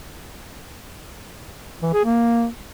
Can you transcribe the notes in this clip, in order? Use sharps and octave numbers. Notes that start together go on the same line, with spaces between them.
E3
G#4
A#3